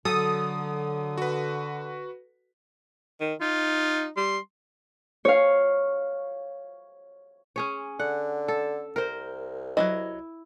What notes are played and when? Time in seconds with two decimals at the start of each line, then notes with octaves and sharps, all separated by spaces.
0.05 D3 F#3 A4 D#6
1.18 F#4 B4
3.20 D#3
3.41 D#4 F4
4.17 G3 C6
5.25 C#5 F5
7.56 C#4 G#4 C#5
7.99 D3 F#5
8.48 A4
8.96 C2 A#4 C5
9.77 F#3 C#4 E4 D#5